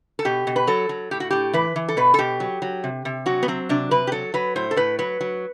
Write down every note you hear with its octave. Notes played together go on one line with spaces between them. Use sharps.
A4
B2 G4
B2
B4
F#3 A4
F#3
A2 G4
F#4
A2 G4
E3 B4
E3
A4
B2 B4
A4
B2 G4
F#3
F#3
C3
C3
F#3 F#4
B3
F#3 C4
C3 D4
C3 B4
G4
F#3 A4
F#3 B4
A2 C5
A4
A2 B4
F#3 B4
F#3